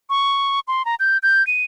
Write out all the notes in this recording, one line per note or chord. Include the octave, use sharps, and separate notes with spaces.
C#6
C6
A#5
G6
G6
D#7